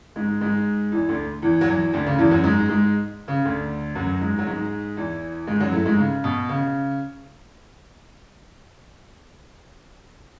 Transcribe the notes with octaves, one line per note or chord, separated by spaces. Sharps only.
G#2 G#3
G#2 G#3
E2 E3
D2 D3
E2 E3
F#3
E2 E3
D2 D3
C#3
E2 E3
F#2 F#3
G#2 G#3
G#2 G#3
C#3
D2 D3
F#2 F#3
G#2 G#3
F#3
G#2 G#3
E2 E3
G#2 G#3
F#2 F#3
A2 A3
G#2 G#3
C#3
B2
C#3